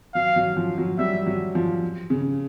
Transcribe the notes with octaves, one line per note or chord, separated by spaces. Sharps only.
F#3 F5
F#3
F3
F#3
G3 E5
F#3
F3
C#3